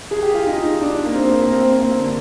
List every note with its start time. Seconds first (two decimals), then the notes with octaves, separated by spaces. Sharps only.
0.11 G#4
0.23 G4
0.34 F4
0.46 D#4
0.58 D#4
0.81 D4
1.05 A#3
1.14 C4
1.24 A#3
1.33 C4
1.42 A#3
1.52 C4
1.61 A#3
1.71 C4
1.81 A#3
1.99 D3